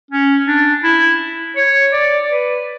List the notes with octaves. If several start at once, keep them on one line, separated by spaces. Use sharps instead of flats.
C#4
D4
E4
C#5
D5
B4